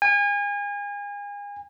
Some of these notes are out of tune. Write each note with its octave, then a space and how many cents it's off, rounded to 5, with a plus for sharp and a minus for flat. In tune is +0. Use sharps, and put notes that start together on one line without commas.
G#5 -35